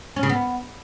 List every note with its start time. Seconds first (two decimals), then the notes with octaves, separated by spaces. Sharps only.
0.16 C#4
0.23 C#3
0.29 B3